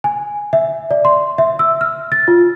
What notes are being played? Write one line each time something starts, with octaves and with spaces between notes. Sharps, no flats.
G#5
E5
D5
C6
E5
E6
F6
A6
F4